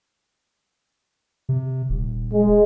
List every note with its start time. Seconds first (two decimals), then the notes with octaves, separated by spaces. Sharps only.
1.49 C3
1.90 D#1
2.34 G#3